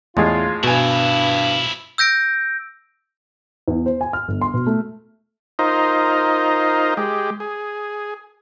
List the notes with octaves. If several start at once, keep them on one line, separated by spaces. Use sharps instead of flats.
E2 A2 G#3 F4 G#4
G2 B2 F3 E4 B4 G#5
E6 G6 A#6 D7
E2
C5
G#5
F6
G1
C6
B2
A3
D#4 F4 A#4 C5 D#5
G#3 G4
G#4